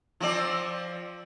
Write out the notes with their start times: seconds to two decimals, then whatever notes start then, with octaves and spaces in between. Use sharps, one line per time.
0.20 F3 C4 D5